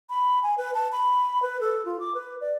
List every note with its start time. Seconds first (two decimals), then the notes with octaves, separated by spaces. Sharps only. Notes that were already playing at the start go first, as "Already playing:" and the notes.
0.10 B5
0.43 G#5
0.58 B4
0.74 A5
0.92 B5
1.42 B4
1.61 A4
1.85 F4
2.00 D6
2.15 B4
2.41 D5